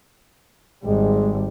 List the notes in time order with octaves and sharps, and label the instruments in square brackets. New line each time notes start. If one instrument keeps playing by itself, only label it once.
[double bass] G#1 G3 [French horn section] G#3